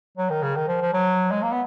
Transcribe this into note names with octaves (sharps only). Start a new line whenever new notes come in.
F#3
D#3
C#3
D#3
F3
F3
F#3
G#3
A#3
B3